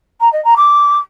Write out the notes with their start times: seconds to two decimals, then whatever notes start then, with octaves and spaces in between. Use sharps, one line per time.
0.20 A#5
0.32 D#5
0.44 A#5
0.56 D6